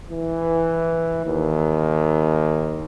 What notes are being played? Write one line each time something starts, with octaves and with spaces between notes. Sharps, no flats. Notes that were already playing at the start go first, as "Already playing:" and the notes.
E3
D#2